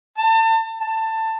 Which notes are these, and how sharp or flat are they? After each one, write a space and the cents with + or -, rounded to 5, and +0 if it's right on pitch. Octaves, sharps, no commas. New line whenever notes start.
A5 +35
A5 +20